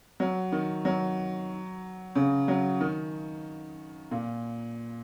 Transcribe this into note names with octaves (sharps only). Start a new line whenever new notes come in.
F#3
D#3
F#3
C#3
F#3
D#3
A#2